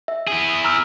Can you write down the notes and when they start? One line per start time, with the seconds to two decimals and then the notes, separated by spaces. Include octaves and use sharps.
0.08 E5
0.27 E4 G#4
0.64 A#5 E6 F6